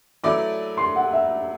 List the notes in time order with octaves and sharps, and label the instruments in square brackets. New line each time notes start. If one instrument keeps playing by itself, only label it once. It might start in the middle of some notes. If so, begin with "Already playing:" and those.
[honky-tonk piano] F#3 A3 E4 B4 D5 [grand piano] D6
[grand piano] C6
F#5
E5